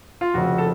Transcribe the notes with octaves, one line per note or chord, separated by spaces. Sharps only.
F4
F1 F2 C#3 F#4
A4